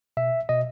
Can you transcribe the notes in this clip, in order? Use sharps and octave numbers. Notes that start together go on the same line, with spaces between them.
B2 E5
B2 D#5